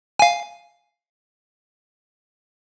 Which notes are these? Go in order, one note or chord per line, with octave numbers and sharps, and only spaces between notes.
F5 G#5